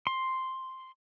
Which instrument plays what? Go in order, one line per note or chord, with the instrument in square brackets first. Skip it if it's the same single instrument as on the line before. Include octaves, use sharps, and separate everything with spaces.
[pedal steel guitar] C6